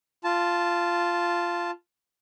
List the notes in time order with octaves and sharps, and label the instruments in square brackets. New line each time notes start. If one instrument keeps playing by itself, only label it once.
[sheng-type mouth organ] F4 A5